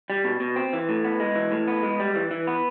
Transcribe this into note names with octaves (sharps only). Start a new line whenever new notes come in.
G3
B2
B2
C4
E3
A2
B3
G#3
E3
A2
B3
G#3
G3
E3
E3
B3